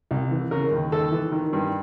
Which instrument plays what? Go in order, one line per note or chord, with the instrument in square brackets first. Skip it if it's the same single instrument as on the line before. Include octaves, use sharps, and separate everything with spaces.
[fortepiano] C2
E3
C#3 A#4
D#2
D#2 A4
E3
D#3
G2